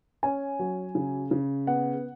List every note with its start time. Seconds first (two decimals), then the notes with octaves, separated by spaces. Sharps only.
0.23 C#4 G#5
0.59 F#3
0.95 C#3
1.31 C#3
1.67 B3 F#5